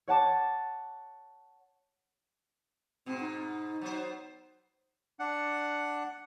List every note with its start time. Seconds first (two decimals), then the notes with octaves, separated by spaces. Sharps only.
0.08 C#5 F#5 A5 D6
3.06 G#2 B2 C4
3.20 D#4
3.81 F#3 B3 C5
5.19 D4 F#5